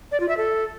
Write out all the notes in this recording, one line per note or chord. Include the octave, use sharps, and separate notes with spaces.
D5
F4
E5
A4